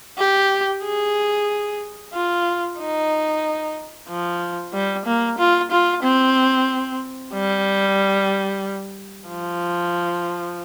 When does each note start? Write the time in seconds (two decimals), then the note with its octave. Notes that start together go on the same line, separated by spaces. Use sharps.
0.19 G4
0.84 G#4
2.14 F4
2.79 D#4
4.09 F3
4.73 G3
5.06 A#3
5.39 F4
5.71 F4
6.03 C4
7.34 G3
9.29 F3